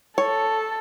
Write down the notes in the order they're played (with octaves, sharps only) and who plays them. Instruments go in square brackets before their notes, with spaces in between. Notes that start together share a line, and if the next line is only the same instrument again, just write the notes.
[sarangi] A4 [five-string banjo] C#5